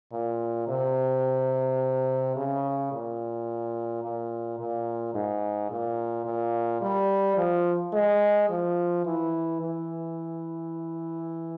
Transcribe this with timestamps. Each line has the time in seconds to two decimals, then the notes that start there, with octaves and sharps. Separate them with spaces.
0.13 A#2
0.68 C3
2.36 C#3
2.92 A#2
4.03 A#2
4.59 A#2
5.14 G#2
5.70 A#2
6.26 A#2
6.81 G3
7.37 F3
7.93 G#3
8.50 F3
9.05 E3
9.61 E3